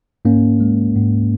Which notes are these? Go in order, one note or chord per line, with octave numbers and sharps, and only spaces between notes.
G#2 A#3 C#4
G#3
G#2